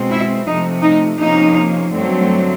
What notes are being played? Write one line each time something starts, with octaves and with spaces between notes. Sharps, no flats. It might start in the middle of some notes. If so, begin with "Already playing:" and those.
Already playing: B2 G#3 C4
E4
C3 F3 A3 D#4
D#4
C3 F3 A#3 C#4 D#4
G2 D3 F#3 A3 C4